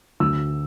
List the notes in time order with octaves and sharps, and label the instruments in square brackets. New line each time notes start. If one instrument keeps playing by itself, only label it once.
[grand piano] D2 E6